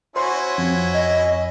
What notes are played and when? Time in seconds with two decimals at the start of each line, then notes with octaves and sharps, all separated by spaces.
0.16 C#4 E4 F#4 C5 C6
0.58 F2
0.93 D#5